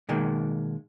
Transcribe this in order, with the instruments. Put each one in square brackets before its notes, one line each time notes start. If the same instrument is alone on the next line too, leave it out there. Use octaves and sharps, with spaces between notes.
[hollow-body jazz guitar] B2 D#3 G#3 A#3